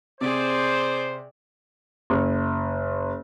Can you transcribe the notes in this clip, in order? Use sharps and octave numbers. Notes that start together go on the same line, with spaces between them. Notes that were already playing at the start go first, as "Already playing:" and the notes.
C3 G#4 C5 D5
F#1